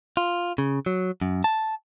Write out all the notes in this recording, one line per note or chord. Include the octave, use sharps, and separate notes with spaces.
F4
C#3
F#3
F#2
A5